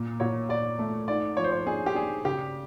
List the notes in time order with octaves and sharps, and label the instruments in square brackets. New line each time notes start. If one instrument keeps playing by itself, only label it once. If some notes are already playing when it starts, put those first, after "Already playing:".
Already playing: [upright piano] A#2
[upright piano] A#2 [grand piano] C#5
[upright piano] A#2 [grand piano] D5
[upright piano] A3
[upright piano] G#2 [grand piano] D5
[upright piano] F3 [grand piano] C#5
[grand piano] C5
C#5
[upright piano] D4 [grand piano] G#4
[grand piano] G4
[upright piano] D4 [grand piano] G#4
[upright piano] C#3 [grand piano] G4